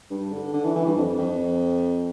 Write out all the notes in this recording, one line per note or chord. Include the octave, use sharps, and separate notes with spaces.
G2
D3
D3
E3
E3
G2
F2
F2